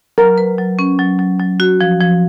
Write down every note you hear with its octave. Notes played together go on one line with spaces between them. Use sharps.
F#3 A#4
B4
F#3
C#4
F#3
F#3
F#3
F#4
F3
F3